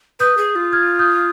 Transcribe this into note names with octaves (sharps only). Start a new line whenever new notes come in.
B4 D#6 G6
G#4
F4
F6 G#6
D#6 G6